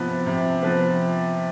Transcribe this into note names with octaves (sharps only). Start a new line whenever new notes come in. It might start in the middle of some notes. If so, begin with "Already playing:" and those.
Already playing: C3 F3 B3
C3
F3 B3